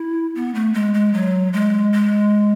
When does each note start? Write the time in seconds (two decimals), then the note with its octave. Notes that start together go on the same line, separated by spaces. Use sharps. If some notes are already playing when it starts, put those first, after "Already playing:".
Already playing: E4
0.35 B3
0.55 A3
0.74 G#3
0.94 G#3
1.14 F#3
1.53 G#3
1.93 G#3